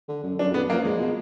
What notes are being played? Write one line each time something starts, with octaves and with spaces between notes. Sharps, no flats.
D3
F#2
F#2 D4
F2
B3
F#2
A#3
F3
F3 G#3
B2